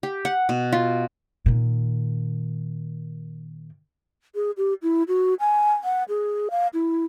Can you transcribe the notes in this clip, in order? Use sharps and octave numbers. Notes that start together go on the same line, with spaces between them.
G4
F#5
B2
F4
A#2 D#3
G#4
G4
E4
F#4
G#5
F#5
G#4
F5
E4